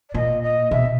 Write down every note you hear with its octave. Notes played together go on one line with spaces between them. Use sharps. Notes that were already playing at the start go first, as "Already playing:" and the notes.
D5
A#2 D#5
D#5
B2 E5